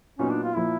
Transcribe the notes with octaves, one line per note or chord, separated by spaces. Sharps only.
A#2 F#3 B3 C#4 D#4
D4
F4
A#2 F3 A#3 E4